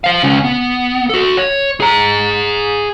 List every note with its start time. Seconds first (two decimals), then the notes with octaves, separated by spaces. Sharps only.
0.04 C5 F5
0.23 C#2 C#4
0.44 B3
1.09 F#4 A4
1.37 C#5
1.80 G#4 A#5